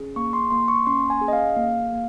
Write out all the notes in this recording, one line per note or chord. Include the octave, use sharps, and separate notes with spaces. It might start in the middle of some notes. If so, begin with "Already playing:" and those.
Already playing: C#4 G#4
A#3 C#6
C6
A#3 C6
C#6
C#4 C6
G#5
G#4
D#5
F5
A#3 F5
A#3